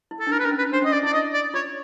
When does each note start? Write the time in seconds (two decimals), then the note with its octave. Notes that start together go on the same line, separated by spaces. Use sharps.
0.11 E4
0.20 A4
0.27 D4
0.31 D#4 A#4
0.39 B4
0.45 D4 A#4
0.51 C#4
0.58 B4
0.72 D4 C5
0.82 C#4 D#5
0.92 D4 D5
1.03 E4 D5
1.13 D#5
1.34 D5
1.54 F4 C#5